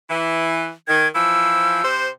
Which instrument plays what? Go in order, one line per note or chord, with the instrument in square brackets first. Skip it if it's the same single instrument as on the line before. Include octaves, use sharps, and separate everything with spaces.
[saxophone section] E3
[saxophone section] D#3 [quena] G#6
[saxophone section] E3 F3 [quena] E6
[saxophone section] C3 C5